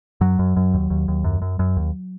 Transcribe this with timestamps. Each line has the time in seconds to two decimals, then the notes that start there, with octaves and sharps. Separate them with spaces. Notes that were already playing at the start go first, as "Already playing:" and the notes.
0.21 F#2 F#3
0.39 F#2
0.57 F#2
0.74 D#2
0.90 D#2
1.08 D#2
1.24 F#2
1.42 F#2
1.59 F#2
1.77 D#2